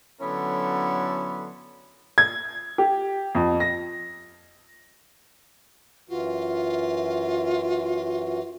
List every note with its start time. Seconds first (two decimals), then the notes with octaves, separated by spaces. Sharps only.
0.20 D3 F#3 B3 C#4 E4 A4
2.18 G#6
2.78 G4
3.35 F2
3.60 A#6
6.10 F#2 E3 F4 F#4